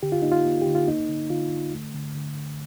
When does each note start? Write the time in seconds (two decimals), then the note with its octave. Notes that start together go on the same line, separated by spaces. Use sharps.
0.03 D3 G4
0.12 F4
0.22 A#3 D#4
0.32 F4
0.45 A#3
0.62 D3 G4
0.75 F4
0.87 A#3 D#4
1.09 D3
1.30 D3 F4
1.51 D3
1.73 A3
1.94 D3
2.15 D3
2.36 D3